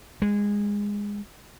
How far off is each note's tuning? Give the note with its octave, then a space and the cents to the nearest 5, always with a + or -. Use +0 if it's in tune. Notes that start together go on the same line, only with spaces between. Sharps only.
G#3 -20